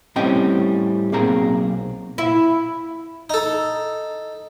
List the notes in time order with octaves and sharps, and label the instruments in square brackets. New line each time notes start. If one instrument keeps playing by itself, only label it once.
[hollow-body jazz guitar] A2 G3 C4 C#4 D#5 G5
B1 A#3 C4 G#4 A#5
[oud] E4
[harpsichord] D#4 A4